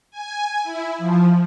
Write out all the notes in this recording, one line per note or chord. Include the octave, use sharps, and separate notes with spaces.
G#5
E4
F3